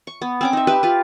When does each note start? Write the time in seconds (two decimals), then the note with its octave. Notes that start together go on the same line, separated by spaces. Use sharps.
0.07 C#6
0.22 B3
0.41 C4 C#4 D6
0.53 D#4 E5
0.67 G4 B4 E5
0.83 F4 B4